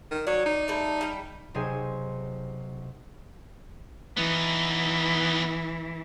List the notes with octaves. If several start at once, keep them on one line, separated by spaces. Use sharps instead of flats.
D#3
F#3 D5
D#4
G3 A3 D5
G3 G5
B1 C3 G#4 C5 G#5
E3 B3 D#4